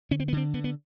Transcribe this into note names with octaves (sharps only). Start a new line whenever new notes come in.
D3 C#4
C4
B3
D3 C4
D3 B3
B3